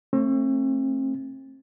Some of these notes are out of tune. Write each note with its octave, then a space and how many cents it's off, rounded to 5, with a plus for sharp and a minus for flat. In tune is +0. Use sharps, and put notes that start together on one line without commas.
A3 +25 C4 +40